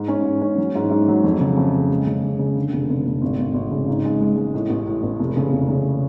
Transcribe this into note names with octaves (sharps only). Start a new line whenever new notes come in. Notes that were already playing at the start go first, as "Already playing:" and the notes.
Already playing: G#2
C#4
G#2
C#4
F#3
G#2
G#2
F#3
F2
C#3
F2
C#3
G#3
C#3
C#3
C#3
D3
F1
F1
F1
G#1
G#1
G#1
C#3
G#2
G#3
G#3
G#3
A2
A1
A2
A1
F1
C#3
F1
C#3